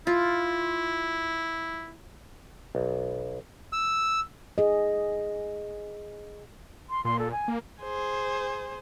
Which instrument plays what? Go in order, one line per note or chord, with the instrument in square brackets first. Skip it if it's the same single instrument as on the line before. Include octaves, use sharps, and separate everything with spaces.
[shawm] E4 [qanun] F4
[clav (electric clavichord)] B1
[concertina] E6
[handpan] G#4 D#5
[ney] C6
[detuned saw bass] A#2 [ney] C6
[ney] A4
G#5
[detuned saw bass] A#3
[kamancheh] G#4 C5